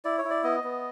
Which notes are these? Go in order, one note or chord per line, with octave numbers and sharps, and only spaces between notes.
E4 D5
C#5
E4
D5
B3 D#5
B3